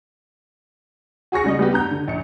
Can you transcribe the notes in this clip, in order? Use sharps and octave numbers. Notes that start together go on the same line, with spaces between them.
F#4 G#4 C#6 A#6 C#7
C#3 G3 D#5
G3 B3 G4
G2 A#5 G6
D3
A#1 C#7